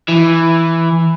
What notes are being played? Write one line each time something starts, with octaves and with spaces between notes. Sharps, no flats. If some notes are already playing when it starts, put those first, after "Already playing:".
E3